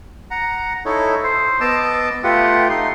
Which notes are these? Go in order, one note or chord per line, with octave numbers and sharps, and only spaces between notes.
F#5 A#5
D#4 E4 A4 C#5
C5
B3 D#5 A5 D6 E6
A3 F4 G4 B4 F#5
A3 D#4 C6